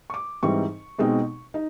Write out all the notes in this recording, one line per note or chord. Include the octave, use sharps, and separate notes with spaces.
C#6
D6
G#2 E3 G3 C4 D#4 C#6
B2 G#3 C4 D#4
D#4